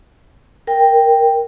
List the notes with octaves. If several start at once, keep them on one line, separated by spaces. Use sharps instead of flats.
A#4 G5